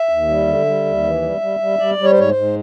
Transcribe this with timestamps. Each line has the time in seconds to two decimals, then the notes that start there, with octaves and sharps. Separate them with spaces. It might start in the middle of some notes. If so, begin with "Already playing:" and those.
Already playing: E5
0.09 D#2
0.29 G3
0.47 D3
0.66 G3
0.85 D#2
1.03 E3
1.22 G3
1.41 G3
1.60 G3
1.79 G3 D5
1.98 G3
2.04 C#5
2.12 C5
2.17 G#2 C#5
2.29 C5
2.36 G#2